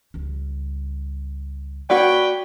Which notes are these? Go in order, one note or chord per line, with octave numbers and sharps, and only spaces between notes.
C#2 G3
A#3 F#4 B4 C#5 D5 G5